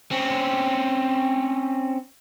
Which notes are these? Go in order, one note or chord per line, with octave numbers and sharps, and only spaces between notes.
C4 C#4